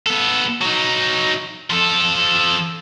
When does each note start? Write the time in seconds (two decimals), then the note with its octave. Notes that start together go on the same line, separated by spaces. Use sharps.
0.07 B3 A4
0.61 F#3 D#4
1.71 F3 A4